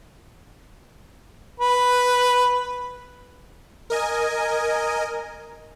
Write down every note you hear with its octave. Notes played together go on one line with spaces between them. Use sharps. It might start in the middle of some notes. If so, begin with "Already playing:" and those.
B4
A#4 D#5 G#5